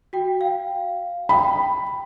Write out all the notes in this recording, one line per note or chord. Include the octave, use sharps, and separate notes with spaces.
F#4 G5
F5
G5 B5